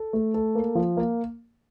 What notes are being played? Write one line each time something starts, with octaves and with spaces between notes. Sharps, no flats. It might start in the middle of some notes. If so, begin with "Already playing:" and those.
Already playing: A4
A3
A4
A#3
F3
A#3